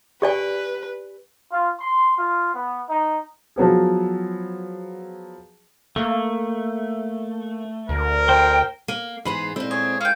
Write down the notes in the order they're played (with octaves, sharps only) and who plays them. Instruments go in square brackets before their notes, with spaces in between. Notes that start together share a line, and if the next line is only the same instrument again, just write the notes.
[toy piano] G4 D5 G#5 [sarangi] B4
[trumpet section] F4
C6
F4
B3
D#4
[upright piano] F3 F#3 B3 G#4
[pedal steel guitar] A3 [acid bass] A#3
[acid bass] D2 [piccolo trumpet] A#4
[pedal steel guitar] C5 C6 [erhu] G5
[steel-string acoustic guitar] A#3
[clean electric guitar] G#2 B5 [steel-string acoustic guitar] E3 B3 G#4 [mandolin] C6
[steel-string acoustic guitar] A#2 C4 [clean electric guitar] G#3 E4 A4
[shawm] G#4 [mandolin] C#5
[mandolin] C#4 G5 [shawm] F5